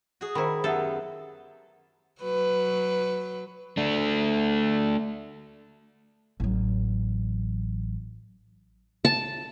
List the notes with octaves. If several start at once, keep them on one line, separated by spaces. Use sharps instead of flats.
F#4 G#4
D#3 E4 C5 A#5 B5
F#2 B3 G4 A4 E5 F#5
F#3 B4
A3 D4
A1 F#3
A5